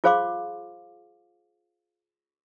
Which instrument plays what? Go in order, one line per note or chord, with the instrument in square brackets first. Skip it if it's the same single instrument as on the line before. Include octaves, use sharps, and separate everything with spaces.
[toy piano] F4 G#4 C5 F5 C6 D6